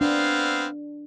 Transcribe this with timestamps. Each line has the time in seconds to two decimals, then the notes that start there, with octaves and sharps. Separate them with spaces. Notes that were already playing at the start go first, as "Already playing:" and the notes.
0.01 B3 C4 D4 F5